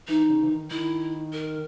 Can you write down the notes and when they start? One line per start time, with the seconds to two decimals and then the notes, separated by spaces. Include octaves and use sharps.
0.08 E3 D#4
0.30 C#3
0.43 E3
0.49 D#3
0.70 D#3 E4
1.33 A#4